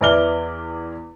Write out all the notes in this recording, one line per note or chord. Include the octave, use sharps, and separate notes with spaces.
E2 E3 E4 D5 F6 G7